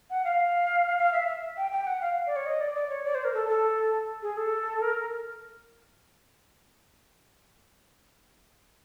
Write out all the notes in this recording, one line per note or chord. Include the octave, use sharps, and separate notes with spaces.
F#5
F5
F5
E5
E5
G5
G5
F#5
F5
D5
C#5
D#5
D5
D5
C#5
D5
C5
A#4
A4
A4
G#4
A4
A#4